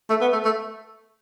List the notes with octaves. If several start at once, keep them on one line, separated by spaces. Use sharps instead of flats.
A3
B3
A3
A3